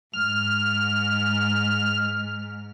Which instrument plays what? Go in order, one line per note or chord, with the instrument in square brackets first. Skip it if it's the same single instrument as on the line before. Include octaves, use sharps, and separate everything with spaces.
[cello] G#2 [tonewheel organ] F6